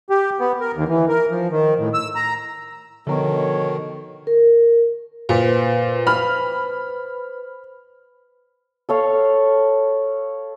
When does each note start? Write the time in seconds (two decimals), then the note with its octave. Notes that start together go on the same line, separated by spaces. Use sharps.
0.10 G4
0.40 B3
0.61 A#4
0.75 D#2
0.88 E3
1.08 A#4
1.31 F3
1.51 D#3
1.79 A2
1.94 E6
2.16 A#5
3.07 B2 D3 D#3 F3 B3 C#5
4.27 A#4
5.29 A#2 B4 C5
6.07 B5 F6
8.89 A4 C#5 F5